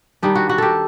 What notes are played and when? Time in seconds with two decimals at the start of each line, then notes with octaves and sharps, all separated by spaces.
0.22 D#3 G3 D4 D#4
0.36 F#4
0.49 F#4
0.58 G4 A4